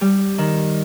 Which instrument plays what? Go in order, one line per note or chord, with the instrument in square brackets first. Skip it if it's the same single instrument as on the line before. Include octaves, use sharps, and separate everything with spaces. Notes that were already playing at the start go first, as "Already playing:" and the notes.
[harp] G3
D#3